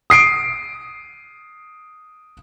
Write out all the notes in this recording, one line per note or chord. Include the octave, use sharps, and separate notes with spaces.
D#6 C7 D7